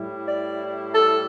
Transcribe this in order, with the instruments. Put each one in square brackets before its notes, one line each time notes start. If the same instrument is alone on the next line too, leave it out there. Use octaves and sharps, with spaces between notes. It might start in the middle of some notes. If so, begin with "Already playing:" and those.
Already playing: [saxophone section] A2 G3 E4
D5
A4